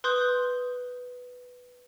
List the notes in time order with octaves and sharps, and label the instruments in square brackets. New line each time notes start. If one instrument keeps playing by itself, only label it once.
[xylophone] B4 C6 D#6 G6